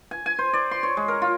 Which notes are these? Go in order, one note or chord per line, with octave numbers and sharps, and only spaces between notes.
G#5
G#5
C5
D5
C6
C#5
G#3
A#4
F4